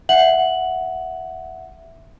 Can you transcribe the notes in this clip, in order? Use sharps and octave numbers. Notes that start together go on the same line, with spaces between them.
E5 F#5 F#7